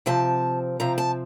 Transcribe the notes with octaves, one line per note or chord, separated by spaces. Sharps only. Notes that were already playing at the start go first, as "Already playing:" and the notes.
C3 F3 C4 A5
C3 F3 C4 A#5
A5